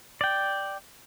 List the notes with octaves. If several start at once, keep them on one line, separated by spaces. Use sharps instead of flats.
D5 G5